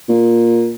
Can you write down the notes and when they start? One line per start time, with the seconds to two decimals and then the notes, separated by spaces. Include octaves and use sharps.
0.09 A#2